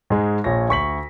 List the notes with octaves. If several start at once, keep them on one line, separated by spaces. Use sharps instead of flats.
G#2 G#3
A#1 F4 C#5 A#6
D2 C#6 B6 F#7